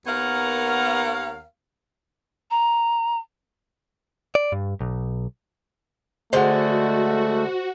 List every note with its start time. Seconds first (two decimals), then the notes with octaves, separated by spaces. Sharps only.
0.07 D#2 B3 A#4 C#5 F5 F#5
2.51 A#5
4.35 D5
4.52 G2
4.81 B1
6.33 D3 G#3 A3 F#4 C5 F#5